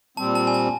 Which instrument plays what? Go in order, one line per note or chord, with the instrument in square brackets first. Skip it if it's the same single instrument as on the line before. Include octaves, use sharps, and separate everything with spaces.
[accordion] A#2 G3 C4 [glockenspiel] A5
[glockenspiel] A5
G#5
A5